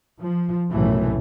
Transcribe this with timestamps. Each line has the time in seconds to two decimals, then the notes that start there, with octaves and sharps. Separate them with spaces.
0.19 F3
0.71 B1 F#2 A2 C3 E3 A3